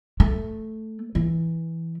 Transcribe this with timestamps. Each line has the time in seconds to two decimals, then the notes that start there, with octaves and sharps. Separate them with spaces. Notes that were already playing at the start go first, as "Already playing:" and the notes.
0.20 A3
1.15 E3